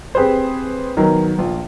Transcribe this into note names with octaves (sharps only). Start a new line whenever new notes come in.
C4 G4 G#4 B4 C5
D#3 F#3 B3 A#4
A#1 F4